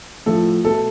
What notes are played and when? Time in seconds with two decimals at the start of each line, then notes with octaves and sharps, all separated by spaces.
0.26 A2 F3 A3 A4
0.64 B2 A3 A4